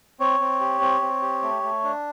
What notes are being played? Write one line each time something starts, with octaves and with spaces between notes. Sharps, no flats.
C4 C#5
C4
G4
C4
C4
G4
A3
A3
D4